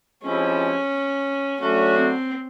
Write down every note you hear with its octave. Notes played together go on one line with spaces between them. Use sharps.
F3 G#3 C4 C#4 E4 G4
F#3 A3 C#4 D4 F#4
C4